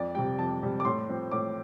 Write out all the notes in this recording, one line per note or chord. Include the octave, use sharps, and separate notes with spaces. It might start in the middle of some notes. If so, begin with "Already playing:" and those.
Already playing: F2 D5
C3 G3 G5
F2 A5
C3 G3
D6
A2 C6
F3 C4
A2 D6